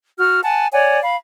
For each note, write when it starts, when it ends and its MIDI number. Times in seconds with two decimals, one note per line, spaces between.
0.18 0.40 66
0.18 0.40 89
0.43 0.67 78
0.43 0.67 80
0.43 0.67 81
0.72 0.98 73
0.72 0.98 74
0.72 0.98 78
0.72 0.98 80
1.02 1.16 77
1.02 1.16 83